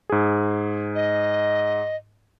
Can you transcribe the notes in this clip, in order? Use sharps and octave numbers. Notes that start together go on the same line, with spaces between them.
G#2 G#4
D#5